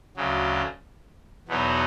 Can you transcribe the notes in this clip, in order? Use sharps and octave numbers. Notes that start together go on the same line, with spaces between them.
D2 C#3 F#3
E2 B2 F#3 B3 D#4